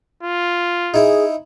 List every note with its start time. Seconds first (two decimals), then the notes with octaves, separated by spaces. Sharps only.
0.23 F4
0.94 D#4 E4 G#4